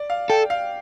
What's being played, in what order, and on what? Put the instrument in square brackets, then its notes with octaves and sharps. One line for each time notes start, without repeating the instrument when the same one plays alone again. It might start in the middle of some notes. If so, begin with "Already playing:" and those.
Already playing: [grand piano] D5
F5
[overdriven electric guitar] A4 [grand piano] G5
[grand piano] F5